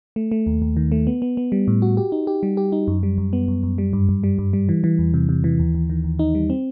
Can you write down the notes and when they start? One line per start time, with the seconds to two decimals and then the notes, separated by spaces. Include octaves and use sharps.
0.16 A3
0.32 A3
0.47 D#2
0.62 D#2
0.77 D#3
0.92 A3
1.07 B3
1.22 B3
1.37 B3
1.52 G3
1.68 A2
1.82 F#4
1.97 G4
2.12 D#4
2.27 G4
2.43 G3
2.57 G4
2.72 D#4
2.88 F#2
3.03 G3
3.18 F#2
3.33 B3
3.48 F#2
3.63 F#2
3.78 G3
3.93 G2
4.09 G2
4.24 G3
4.38 G2
4.53 G3
4.69 E3
4.84 E3
4.99 E2
5.14 C3
5.29 C3
5.44 E3
5.59 D#2
5.75 D#2
5.90 D#3
6.04 D#2
6.19 D#4
6.35 G3
6.50 C4